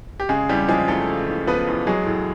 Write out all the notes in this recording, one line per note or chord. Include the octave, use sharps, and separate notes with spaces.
G4
C#3 G#3 G#4
E2 G3 G4
F3 G#3 G#4
E2 A3 A4
C#3
E2
F3 B3 B4
E2
F#3 G#3 G#4
A2